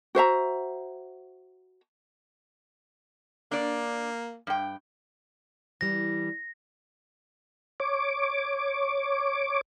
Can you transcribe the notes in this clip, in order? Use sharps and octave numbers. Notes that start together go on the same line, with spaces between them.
F#4 C5 E5 A#5
A#3 D4 D5
G2 G5
E3 G3 A#6
C#5 D6